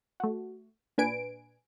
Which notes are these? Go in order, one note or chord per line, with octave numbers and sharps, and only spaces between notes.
A3 F#4
A#2 D4 B4 G#5 D7